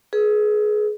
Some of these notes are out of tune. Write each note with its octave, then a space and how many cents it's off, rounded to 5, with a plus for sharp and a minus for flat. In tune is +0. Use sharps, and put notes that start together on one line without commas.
G#4 +25 B4 -20